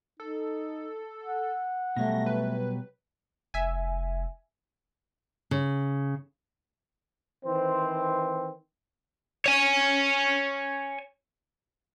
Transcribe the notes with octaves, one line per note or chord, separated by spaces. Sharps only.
D#4 A4
F#5
B2 F#3 G3 A3 A#6
B4
F1 E5 G#5
C#3
D#3 E3 C4 C5
C#5 G#5